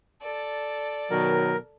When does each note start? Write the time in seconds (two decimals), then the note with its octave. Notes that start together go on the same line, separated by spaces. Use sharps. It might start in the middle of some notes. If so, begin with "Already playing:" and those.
0.22 A4 D5
1.11 B2 D#3 F#3 A#4